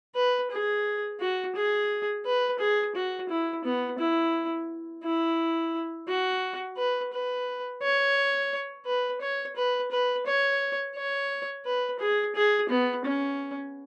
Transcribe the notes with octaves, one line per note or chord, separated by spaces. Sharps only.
B4
G#4
F#4
G#4
B4
G#4
F#4
E4
B3
E4
E4
F#4
B4
B4
C#5
B4
C#5
B4
B4
C#5
C#5
B4
G#4
G#4
B3
C#4